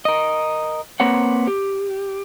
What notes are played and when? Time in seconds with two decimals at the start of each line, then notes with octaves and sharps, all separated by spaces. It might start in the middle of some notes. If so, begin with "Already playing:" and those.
0.05 A#4 D#5
1.00 A#3 C4 B4 C#5 F#5
1.48 G4